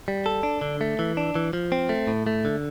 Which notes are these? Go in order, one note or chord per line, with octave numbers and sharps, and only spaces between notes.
G3
A4
D4
D3
A3
E3
D4
E3
F3
C4
A3
A2
A3
D3